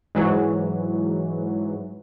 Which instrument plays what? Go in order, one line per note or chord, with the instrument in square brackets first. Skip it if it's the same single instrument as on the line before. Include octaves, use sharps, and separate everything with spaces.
[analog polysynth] G#2 E3 F#3